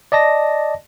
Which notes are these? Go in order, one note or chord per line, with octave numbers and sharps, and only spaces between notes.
D5 D#5 A5 A#6